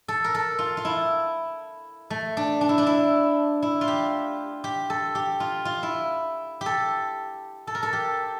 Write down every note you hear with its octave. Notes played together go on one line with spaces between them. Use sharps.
A4
A#4
A4
F4
F4
E4
A3
D4
D4
E4
D4
E4
E4
F4
G4
G4
A4
G4
F4
F4
E4
G4
A4
A4
A#4
A4
G4